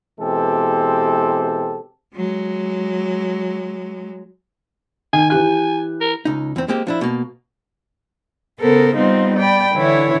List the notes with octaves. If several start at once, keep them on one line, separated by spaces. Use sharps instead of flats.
B2 E3 G#3 C4 G4 A4
F#3 G#3
D#3 G#5
E3 G4 G#5 F#6
A#4
C#2 D#4
E2 C4
G#3 A#3 C4 G4
F3 D4 E4
B2 A#3
C#3 B3 A4 A#4 C5
G3 B3 C4 D#4 F4
D5 G5 B5
D3 E3 D4 E4 C#5